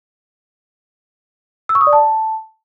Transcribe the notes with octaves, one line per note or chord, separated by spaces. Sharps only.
E6
C#6
D#6
D5
A5